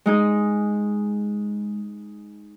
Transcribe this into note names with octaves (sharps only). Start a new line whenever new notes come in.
G#3 D#4 G#4